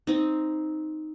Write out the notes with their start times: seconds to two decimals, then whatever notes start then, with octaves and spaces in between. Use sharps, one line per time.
0.07 C4 D#4